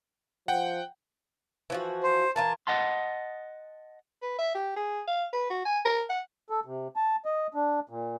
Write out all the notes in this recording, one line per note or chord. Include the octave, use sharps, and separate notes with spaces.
F3 F#5 G5
E3 F3 F#4
C5
E3 F4 A#4 A5
D#5 F#5 A5 C6
B4
E5
G4
G#4
F5
B4
F#4
G#5
A#4
F#5
A4
C3
A5
D#5
D4
A#2